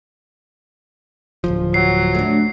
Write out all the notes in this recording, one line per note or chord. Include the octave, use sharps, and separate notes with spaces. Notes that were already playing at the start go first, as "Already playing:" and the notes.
D1 A#1 F3
F#3 C7
A3 D4